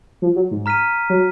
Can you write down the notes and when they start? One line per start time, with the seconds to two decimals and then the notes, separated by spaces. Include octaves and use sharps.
0.22 F3
0.36 F#3
0.51 G#2
0.66 A#5 F6 B6 D#7
1.10 F#3